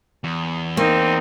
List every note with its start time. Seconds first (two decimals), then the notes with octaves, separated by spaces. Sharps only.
0.24 E2
0.77 A#3 C4 D#4